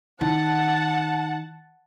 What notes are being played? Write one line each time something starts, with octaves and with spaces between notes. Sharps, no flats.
D#3 F#5 A5